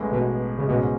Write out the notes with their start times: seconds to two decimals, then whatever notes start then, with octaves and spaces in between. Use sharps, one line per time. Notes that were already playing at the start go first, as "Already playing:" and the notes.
Already playing: A1 A2 G#3
0.12 B2
0.58 C#3
0.68 A1 G#2 B2 G#3 C#4